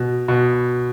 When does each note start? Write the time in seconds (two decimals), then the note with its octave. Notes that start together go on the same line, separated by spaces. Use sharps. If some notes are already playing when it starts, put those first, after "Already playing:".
Already playing: B2
0.28 B2